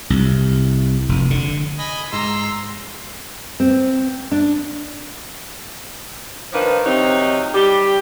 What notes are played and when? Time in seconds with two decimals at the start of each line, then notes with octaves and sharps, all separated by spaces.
0.10 C2
1.09 F1
1.30 D3
1.79 D#5 G#5 B5
2.13 G#2 A#5 C6 E6
3.60 C4
4.32 D4
6.53 D#3 F3 A#3 D4 B4
6.84 C3 F3 F#3 C4 D#4
7.54 G3 G4